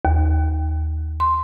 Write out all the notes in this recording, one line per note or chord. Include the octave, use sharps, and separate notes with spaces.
D#2
C6